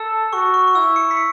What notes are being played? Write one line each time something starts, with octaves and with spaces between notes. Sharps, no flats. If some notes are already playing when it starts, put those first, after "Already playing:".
Already playing: A4 E6
F#4 C#6
C#6
C#6
E4 E6
C#7
B6
C#7